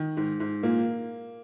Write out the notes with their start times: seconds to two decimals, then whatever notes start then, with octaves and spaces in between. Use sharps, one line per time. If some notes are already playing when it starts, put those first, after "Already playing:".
Already playing: D#3
0.17 G#2
0.40 G#2
0.63 A#2 A#3